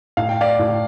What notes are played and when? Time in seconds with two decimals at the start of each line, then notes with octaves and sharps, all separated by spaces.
0.17 A2 F5
0.29 G5
0.41 D5 F5
0.59 A2